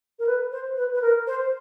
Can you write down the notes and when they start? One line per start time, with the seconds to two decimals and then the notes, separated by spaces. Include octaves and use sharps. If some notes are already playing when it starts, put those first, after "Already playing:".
0.19 A#4
0.27 B4
0.51 C5
0.77 B4
0.93 B4
1.02 A#4
1.27 C5